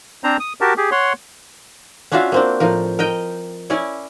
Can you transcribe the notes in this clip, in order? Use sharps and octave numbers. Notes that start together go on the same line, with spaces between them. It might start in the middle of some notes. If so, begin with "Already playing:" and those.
C4 D4 C5 A#5
D#6
F#4 G4 A#4 A5
G4 G#4
C#5 F#5 C6
C#4 D4 F4 F#4 E5 F5
A#3 C4 D4
A2 F3 A#4
A#4 D#5 G5
C#4 E4 C#5 D5